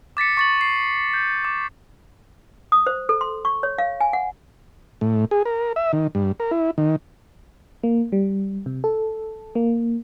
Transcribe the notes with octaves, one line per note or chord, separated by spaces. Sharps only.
D6 A6 B6 C#7
C#6 A6 F#7
C7
G6
D6
D#6
C5
A4
C6
C#6
C#5
F5
G#5
F#5
A2
G#4
A#4
E5
D#3
G2
A#4
E4
D#3
A#3
G3
C3
A4
A#3